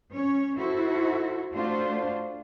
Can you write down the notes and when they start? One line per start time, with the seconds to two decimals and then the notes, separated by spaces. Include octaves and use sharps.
0.13 C#4 C#5
0.58 E4 F#4 A4 C5
1.53 A3 D4 F4 F#4 C5